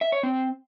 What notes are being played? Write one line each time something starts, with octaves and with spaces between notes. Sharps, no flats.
E5
C#5
C4